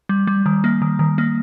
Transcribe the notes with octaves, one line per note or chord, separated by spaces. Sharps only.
G3
G3
D#3
A#3
D#3
D#3
A#3